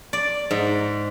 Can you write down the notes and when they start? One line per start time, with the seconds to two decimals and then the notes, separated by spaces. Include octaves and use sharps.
0.13 D5
0.51 G#2